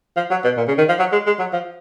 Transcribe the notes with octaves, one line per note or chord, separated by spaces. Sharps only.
F3
F#3
B2
A#2
C#3
D#3
F3
F#3
G#3
G#3
F#3
F3